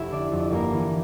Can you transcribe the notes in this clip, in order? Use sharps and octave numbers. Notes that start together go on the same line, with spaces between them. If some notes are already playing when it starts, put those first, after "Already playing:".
Already playing: F1 E4 E5
D3 D4 D5
F2
G1 A#3 A#4
E3